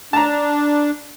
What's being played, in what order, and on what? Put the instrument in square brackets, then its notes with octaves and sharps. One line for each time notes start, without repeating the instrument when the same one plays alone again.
[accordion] D4 [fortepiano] A5 A#5